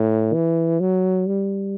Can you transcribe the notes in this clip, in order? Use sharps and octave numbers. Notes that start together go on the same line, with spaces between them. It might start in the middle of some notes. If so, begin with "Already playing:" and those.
Already playing: A2
E3
F#3
G3